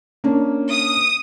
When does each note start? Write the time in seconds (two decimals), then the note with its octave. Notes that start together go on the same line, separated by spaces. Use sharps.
0.24 A#3 C#4 D4
0.71 D#6